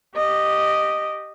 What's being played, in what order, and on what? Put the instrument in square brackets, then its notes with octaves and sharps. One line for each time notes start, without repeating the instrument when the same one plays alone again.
[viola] G4 D#5